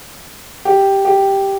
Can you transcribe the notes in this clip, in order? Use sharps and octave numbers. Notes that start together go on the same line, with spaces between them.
G4
G4